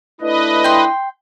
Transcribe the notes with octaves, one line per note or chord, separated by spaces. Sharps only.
A3 D4 E4 B4 D#5
G5 C6